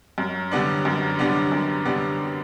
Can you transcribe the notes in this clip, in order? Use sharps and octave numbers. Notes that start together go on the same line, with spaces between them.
F#2
D3 G3 B3 D4
F#2
D3 G3 B3 D4
F#2
D3 G3 B3 D4